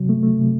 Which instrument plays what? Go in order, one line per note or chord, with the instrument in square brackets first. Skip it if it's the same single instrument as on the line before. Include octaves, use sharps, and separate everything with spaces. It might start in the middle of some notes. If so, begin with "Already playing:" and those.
Already playing: [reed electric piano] C3 F#3
A3
A3
C3